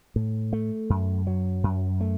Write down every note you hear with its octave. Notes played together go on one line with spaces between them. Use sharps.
A2
A3
F#2
F#3
F#2
A3